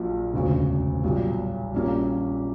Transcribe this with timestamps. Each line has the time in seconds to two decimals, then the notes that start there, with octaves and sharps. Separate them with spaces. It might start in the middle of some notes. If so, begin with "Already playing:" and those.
Already playing: A#1 A#2 F#3
0.34 E1 D2 C#3
1.03 B1 A#2 G3
1.73 A#1 A#2 G3 A#3 C#4